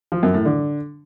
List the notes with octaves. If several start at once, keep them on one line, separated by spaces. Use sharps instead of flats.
F3
F#2
A2
D3